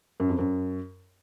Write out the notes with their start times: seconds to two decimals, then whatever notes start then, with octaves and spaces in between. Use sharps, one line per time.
0.20 F#2
0.29 F2
0.39 F#2